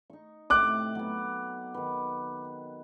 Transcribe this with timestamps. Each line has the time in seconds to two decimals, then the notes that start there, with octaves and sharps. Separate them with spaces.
0.10 D#4 C#6
0.50 A2 C3 D6 F#6
0.95 F#3 B3
1.74 D#3 B4